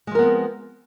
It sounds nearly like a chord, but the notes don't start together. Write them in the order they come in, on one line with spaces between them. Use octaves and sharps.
G#3 F3 A#4 B3 C4